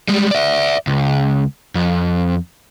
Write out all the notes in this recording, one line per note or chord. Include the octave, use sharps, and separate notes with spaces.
G3 G#3
D5 E5
C#2
F2